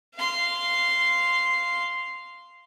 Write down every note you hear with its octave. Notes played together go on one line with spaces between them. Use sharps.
F5 C6